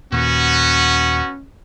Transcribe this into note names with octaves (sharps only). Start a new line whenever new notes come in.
D#2 A#2 B3 C#4 F#4